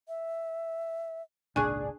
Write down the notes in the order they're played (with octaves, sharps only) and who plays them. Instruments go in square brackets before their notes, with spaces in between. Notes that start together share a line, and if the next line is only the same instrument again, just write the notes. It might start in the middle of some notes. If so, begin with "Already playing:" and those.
[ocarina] E5
[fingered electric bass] G#1 C#2 A#2 [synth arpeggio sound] D4 G#4 [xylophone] G#5 C#6 F#6